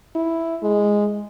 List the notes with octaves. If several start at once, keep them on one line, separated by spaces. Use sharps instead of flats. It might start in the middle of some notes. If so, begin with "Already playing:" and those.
E4
G#3